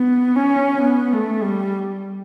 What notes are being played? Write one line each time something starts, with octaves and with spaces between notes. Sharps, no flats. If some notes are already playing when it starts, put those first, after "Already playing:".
Already playing: B3
C#4
B3
A3
G3